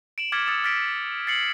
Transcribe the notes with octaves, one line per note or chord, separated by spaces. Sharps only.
D7 E7 F#7
D6 F6 G#6 A6 B6 C#7
D#6 E6 A6 C#7
F6 A6 B6 D7
A6 C7 C#7 F#7